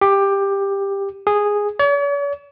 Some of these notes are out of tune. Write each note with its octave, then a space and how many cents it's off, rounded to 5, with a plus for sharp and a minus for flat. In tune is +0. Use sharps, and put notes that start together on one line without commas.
G4 +15
G#4 -10
C#5 +45